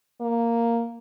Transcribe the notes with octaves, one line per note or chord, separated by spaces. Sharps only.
A#3